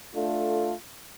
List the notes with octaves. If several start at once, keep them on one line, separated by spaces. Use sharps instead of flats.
A3 D4 F4 A4